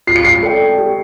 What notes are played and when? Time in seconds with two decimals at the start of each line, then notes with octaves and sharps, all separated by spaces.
0.07 F4 C7
0.16 C#7
0.24 C7
0.43 A4 D5 G5
0.78 G4